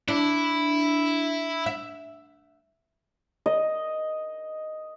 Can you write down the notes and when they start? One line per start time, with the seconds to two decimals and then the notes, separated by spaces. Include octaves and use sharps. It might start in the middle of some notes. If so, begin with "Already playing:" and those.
0.08 D4 E4
1.66 E5
3.46 D#5